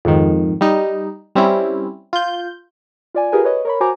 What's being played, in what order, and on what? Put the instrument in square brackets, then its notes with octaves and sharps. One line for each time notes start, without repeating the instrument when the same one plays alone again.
[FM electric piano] F2 G#2 D#3
G3 D#4
G3 C4 C#4 E4
F4 G6
[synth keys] F4 D5 G#5
F4 G4 G#4 A#4 B4 G#5
B4 C#5 D#5
A#4 C#5 B5
F#4 C5 G#5 A#5 D6